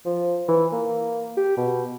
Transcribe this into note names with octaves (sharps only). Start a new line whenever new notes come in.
F3
E3
A#3
G4
B2